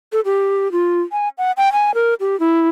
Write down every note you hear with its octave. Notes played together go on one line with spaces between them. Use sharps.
A4
G4
F4
G#5
F#5
G5
G#5
A#4
G4
E4